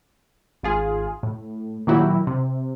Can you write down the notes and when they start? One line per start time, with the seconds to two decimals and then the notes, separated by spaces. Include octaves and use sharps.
0.63 G#1 F4 G#4
1.23 A2
1.87 A#2 D#3 F#3 E4 F#4 G4
2.27 C3